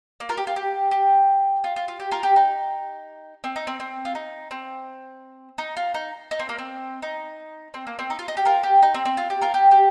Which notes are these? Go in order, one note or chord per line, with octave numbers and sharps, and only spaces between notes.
A#3
F4 A#4
G4
F4
G4
G4
F4
F4
F4
G4
F4 A#4
G4
D#4
C4
D#4
C4
C4
F4
D#4
C4
D#4
F4
D#4
D#4
C4
A#3
C4
D#4
C4
A#3
C4
D#4
F4
D#4
G4
F4 A#4
G4
D#4
C4
C4
F4
G4
F4 A#4
G4
G4